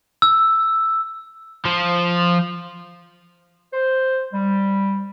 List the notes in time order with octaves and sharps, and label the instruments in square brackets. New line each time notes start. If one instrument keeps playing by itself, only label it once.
[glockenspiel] E6
[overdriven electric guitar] F3
[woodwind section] C5
G3